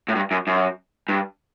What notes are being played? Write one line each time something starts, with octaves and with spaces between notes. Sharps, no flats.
A2
G2
F#2
F#2
G2